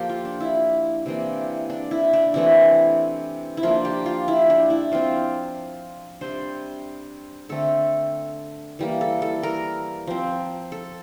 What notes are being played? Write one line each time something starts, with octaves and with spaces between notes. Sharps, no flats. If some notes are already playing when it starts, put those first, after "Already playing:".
Already playing: F3 A#3 G4 A4
F4
D4
E4
C3 E3 A#3 D4
D4
E4
D4
C3 E3 A3 E4
E4
F3 A#3 D4 F4
G4
F4
E4
D4
E4
F3 C4 F4
C3 G3 D4 C5
D3 A3 C4 A4
E3 G3 A#3
A4
A4
A#4
F3 C4
A4